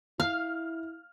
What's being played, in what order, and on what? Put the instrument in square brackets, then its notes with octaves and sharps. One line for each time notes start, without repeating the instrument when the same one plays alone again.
[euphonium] E4 [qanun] F5 [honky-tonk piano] F6